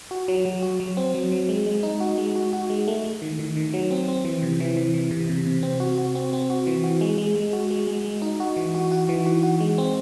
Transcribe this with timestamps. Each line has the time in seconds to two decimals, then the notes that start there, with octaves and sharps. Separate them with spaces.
0.11 F#4
0.28 F#3
0.45 F#3
0.63 F#4
0.80 F#3
0.97 C4
1.14 F#3
1.32 F#3
1.49 G#3
1.66 G#3
1.83 D#4
2.00 F#4
2.18 G#3
2.35 F#4
2.53 F#4
2.70 G#3
2.88 A3
3.04 A3
3.22 D#3
3.39 D#3
3.57 D#3
3.74 F#3
3.91 C4
4.08 C4
4.25 E3
4.43 C3
4.60 E3
4.77 E3
4.94 E3
5.11 C3
5.29 C3
5.47 C3
5.63 C4
5.80 F#4
5.98 F#4
6.15 C4
6.33 C4
6.50 F#4
6.67 E3
6.84 F#4
7.01 G#3
7.18 G#3
7.35 G#3
7.53 F#4
7.71 G#3
7.87 G#3
8.05 G#3
8.22 D#4
8.40 F#4
8.57 E3
8.75 F#4
8.92 F#4
9.09 E3
9.26 F#4
9.43 F#4
9.60 G#3
9.78 C4